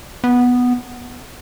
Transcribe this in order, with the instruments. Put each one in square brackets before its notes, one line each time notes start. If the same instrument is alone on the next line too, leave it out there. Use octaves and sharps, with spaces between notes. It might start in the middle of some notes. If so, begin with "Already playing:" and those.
[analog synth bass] B3